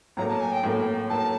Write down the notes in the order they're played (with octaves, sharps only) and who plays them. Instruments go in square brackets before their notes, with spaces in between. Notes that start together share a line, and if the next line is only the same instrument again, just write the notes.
[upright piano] A2 F#3 A#3 [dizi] A#5
[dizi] A5
G#5
G5
[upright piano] A2 F#3 A#3
[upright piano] A2 F#3 A#3 [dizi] A5